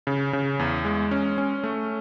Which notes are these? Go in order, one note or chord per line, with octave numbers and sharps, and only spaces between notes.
C#3
C#3
E2
G#3
C#4
C#4
A3